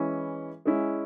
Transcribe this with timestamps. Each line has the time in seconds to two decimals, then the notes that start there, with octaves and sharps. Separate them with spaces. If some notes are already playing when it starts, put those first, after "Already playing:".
Already playing: E3 G#3 C#4 E4
0.65 G#3 C#4 E4